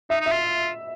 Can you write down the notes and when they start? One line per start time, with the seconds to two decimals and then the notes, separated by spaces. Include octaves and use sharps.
0.10 D#4 E5
0.21 D#4
0.26 E5
0.31 F4